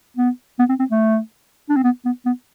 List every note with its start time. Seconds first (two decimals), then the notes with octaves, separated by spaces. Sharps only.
0.17 B3
0.59 B3
0.69 C4
0.79 C4
0.90 A3
1.69 D4
1.76 C4
1.84 B3
2.05 B3
2.26 B3